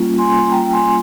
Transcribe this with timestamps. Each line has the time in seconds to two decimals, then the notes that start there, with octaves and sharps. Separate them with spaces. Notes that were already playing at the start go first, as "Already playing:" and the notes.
Already playing: G3 A#3 C#4 F4
0.18 G#5 C6
0.51 G5 A#5
0.72 G#5 C6